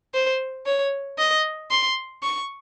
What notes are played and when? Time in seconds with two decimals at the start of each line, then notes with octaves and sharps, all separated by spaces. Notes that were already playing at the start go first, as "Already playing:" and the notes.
0.14 C5
0.66 C#5
1.18 D#5
1.71 C6
2.23 C#6